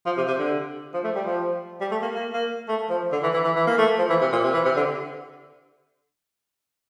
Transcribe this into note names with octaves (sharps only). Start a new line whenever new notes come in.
F3
C3
C3
D3
F3
A3
G3
F3
G3
A3
A#3
A#3
A#3
A3
F3
D3
E3
E3
E3
E3
A#3
A3
F3
E3
C3
A#2
C3
E3
C3
D3